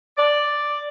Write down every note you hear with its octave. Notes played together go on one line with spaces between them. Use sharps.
D5